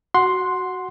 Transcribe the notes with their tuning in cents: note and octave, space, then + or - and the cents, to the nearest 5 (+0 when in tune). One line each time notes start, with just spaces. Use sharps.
F#4 +5 F#5 -10 C6 +5